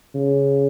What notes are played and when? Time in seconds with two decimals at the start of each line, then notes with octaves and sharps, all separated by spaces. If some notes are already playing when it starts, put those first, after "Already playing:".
0.15 C#3